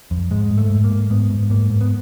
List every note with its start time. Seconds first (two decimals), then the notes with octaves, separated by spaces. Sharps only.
0.11 F2
0.31 G#2 G#3
0.51 G#2
0.58 A3
0.70 G#2
0.84 A#3
0.90 G#2
1.10 G#2 B3
1.30 G#2
1.50 G#2 A#3
1.70 G#2
1.81 B3